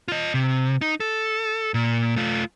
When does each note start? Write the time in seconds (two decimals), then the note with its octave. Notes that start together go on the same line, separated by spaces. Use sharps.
0.08 F4 D#5
0.34 C3
0.81 D#4
1.00 A4
1.74 A#2
2.17 A3 F4